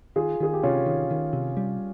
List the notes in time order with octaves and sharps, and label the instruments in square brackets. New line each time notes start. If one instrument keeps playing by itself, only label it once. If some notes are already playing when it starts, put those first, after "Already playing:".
[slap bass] D#3 [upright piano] F4 G#4
[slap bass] D#3 [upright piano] G#4
[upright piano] G4
[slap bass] C3 [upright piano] C#4 F4
[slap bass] D#3
D#3
C3
G3